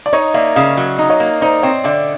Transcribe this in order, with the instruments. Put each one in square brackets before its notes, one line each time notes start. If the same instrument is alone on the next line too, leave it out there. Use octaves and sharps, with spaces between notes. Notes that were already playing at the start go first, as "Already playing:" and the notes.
[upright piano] D5
[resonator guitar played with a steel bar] D#4 [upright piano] C#5 D#5
[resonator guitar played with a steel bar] A#3 [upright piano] D5 E5
[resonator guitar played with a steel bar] C#3 [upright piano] D#5 F5
[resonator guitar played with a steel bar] F#3
D#4
[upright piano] C#5 D#5
[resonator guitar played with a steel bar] A#3
[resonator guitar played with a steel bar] D#4 [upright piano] C5 D5
[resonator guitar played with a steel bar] C4 [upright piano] C#5 D#5
[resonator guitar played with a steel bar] D3 [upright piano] D5 E5